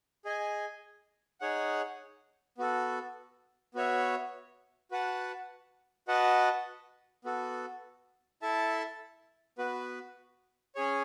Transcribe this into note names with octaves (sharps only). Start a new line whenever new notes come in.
G#4 D#5 G#5
D#4 G#4 C#5 F#5
B3 F#4 A4
B3 F#4 C#5 E5
F#4 B4 F#5 A5
F#4 B4 D#5 F#5 A5
B3 F#4 A4
E4 A4 E5 A5
B3 F#4 B4
C#4 G#4 C#5